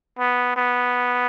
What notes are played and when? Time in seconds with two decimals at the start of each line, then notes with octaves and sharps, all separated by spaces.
0.19 B3
0.56 B3